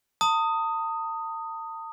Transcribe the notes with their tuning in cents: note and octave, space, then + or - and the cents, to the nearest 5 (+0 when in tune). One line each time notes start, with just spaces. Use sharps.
A5 +45 D#6 +0